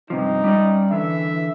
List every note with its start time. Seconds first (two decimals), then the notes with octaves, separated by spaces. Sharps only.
0.10 G2 C3 F3 D#4
0.44 G3 C#4 D5
0.91 D3 E3 E5